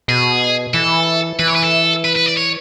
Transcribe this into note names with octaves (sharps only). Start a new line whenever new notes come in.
B2 G#4
E3 A4
E3 B4
C#5
B4
A4
B4
B4
D5
C#5